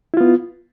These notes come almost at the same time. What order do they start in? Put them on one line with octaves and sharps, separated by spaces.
E4 F4 B3